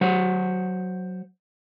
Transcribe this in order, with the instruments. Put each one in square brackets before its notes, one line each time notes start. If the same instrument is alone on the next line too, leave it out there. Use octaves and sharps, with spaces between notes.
[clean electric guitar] F#3 C5 F#5